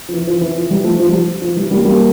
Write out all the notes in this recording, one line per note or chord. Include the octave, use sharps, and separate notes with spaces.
F3
E3
F3
E3
F3
E3 G3
F3 A3
F3
G3
F3
F3
E3 G3
G3 A#3
G3 A#3